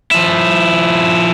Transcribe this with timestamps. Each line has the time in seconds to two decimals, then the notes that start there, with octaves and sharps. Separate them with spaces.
0.11 F3 E4